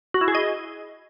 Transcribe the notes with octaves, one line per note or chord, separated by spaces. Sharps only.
F#4
E4
G#4
D#5